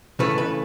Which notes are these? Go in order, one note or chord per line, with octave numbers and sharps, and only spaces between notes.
C#3 E3 A3 B4
B4